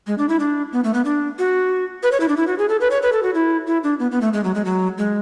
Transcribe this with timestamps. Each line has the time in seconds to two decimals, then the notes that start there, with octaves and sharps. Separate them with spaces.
0.07 G#3
0.18 D4
0.29 E4
0.40 D4
0.73 B3
0.84 A3
0.94 B3
1.05 D4
1.39 F#4
2.03 B4
2.12 C#5
2.20 E4
2.28 D4
2.37 E4
2.47 F#4
2.58 G#4
2.69 A4
2.81 B4
2.90 C#5
3.02 B4
3.12 A4
3.23 F#4
3.34 E4
3.67 E4
3.84 D4
3.99 B3
4.11 B3
4.21 A3
4.33 G#3
4.44 F#3
4.55 G#3
4.65 F#3
4.98 G#3